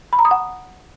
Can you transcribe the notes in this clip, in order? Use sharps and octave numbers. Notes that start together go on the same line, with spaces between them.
B5
A#5
D#6
F#5